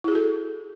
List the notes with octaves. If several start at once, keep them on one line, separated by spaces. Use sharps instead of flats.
E4 F#4 G#4 A4